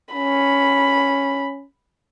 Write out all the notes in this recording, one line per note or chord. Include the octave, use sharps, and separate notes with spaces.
C#4 B5